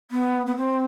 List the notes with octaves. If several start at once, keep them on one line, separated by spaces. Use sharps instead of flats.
B3
B3
C4